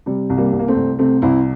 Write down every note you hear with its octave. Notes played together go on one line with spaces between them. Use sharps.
C3 G3
C2
G3 A#3
C2
A#3
A3 C4
C2
C3 A3 C4
C2 C4 E4